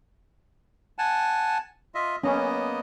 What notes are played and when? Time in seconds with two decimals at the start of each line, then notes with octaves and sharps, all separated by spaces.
0.98 F#5 G#5 A5
1.95 F4 D#5 E5
2.24 A#3 B3 C#4 D#5